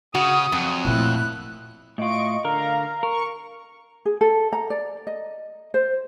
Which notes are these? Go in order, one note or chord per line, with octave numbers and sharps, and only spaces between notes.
C#3 F#4 D#6
F2 F#3
A#2 A3 E4 F#6
A2 F4 D#5 C#6 D7
D3 A#4 F5 A#5
A#4 C#6
G#4
A4
A#5
D5
D#5
C5